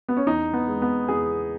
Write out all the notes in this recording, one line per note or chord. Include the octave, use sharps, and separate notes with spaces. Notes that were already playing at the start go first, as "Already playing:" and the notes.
B3
C#4
E2 D#4
B3
G#3
B3
E2 G#4